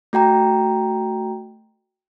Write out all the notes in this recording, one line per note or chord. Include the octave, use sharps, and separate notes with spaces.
A3 F#4 G5 A#5